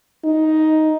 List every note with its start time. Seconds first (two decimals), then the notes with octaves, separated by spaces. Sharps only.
0.24 D#4